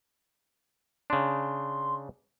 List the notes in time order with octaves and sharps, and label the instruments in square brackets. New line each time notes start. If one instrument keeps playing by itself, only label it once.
[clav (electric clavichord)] C#3 D4 [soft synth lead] C6